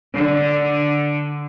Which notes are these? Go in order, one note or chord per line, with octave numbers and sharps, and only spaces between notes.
D3